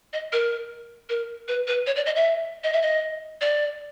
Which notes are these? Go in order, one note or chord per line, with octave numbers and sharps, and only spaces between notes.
D#5
A#4
A#4
B4
B4
C#5
D5
D#5
E5
D#5
E5
D#5
D5